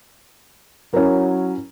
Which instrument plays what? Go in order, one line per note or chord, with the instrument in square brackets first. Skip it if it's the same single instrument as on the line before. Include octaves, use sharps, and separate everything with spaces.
[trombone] F#3 [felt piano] C#4 E4 A#4